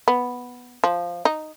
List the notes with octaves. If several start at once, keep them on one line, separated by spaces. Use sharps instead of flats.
B3
F3
D#4